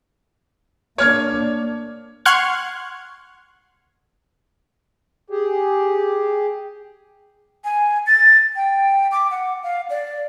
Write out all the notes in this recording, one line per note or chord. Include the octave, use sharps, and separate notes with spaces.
A#3 D4 C#5 F6 G#6
F#5 C6 C#6 F6 F#6 G#6
G4 G#4
G#5
A6
G5
D6
F#5
F5
D5